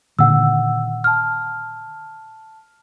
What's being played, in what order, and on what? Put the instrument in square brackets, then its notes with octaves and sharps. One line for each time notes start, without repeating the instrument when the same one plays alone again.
[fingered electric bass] A#2 D3 D#3 [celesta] F#5 E6
[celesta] A5 F6